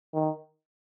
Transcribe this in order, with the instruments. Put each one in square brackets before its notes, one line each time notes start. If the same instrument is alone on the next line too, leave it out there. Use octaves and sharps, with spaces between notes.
[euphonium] D#3